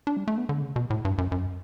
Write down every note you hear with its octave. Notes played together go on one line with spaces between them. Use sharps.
D4
G3
A3
B3
D3
C#3
B2
A2
G2
F#2
F#2